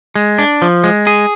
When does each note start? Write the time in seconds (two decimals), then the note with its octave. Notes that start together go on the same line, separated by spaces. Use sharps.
0.15 G#3
0.39 D4
0.62 F3
0.84 G#3
1.07 G#4